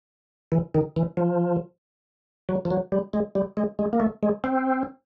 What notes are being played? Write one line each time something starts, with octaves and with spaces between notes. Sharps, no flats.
E3
D#3
E3
F3
F#3
F3
F#3
G3
G#3
G3
G#3
G#3
A#3
A3
G#3
C4